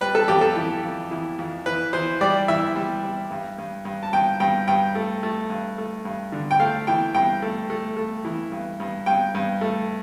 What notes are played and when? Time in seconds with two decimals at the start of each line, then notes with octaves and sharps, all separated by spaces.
0.01 G3 B4
0.15 A4
0.28 F2 G4
0.41 A4
0.56 E3
0.84 F2
1.11 E3
1.39 F2
1.66 E3 B4
1.93 E3 C5
2.21 G3 D5
2.48 E3 E5
2.76 G3
3.03 G3
3.31 G2
3.58 G2
3.85 G2
4.03 A5
4.13 G2 G5
4.40 G2 G5
4.68 G2 G5
4.95 A3
5.23 A3
5.50 G2
5.78 A3
6.05 G2
6.32 D3
6.51 G5
6.60 A3 F5
6.87 E3 G5
7.14 G2 G5
7.42 A3
7.70 A3
7.97 A3
8.25 E3
8.52 G2
8.80 G2
9.06 G2 G5
9.35 G2
9.61 A3